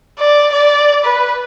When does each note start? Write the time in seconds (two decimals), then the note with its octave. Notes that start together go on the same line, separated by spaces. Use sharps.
0.19 D5
0.53 D5
1.04 B4